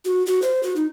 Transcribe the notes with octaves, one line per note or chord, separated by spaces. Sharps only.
F#4
F#4
C5
F#4
D#4